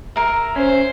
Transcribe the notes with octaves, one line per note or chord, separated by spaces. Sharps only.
A#4 E5
C#4 C5